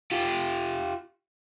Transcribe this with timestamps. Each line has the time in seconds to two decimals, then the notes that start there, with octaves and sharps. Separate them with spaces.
0.11 F4 G4